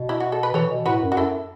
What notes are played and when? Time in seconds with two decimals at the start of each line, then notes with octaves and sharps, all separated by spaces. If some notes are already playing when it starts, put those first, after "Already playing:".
Already playing: B2
0.09 E4
0.20 F#4
0.32 A4
0.43 B4
0.54 E3 A4 C#5
0.70 B2
0.86 A2 F#4 B4
1.02 F#2
1.12 F#4
1.17 F#2 E4 A4